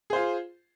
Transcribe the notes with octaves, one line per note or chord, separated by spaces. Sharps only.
F4 G#4 C5